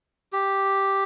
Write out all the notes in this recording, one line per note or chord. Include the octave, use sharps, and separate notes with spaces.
G4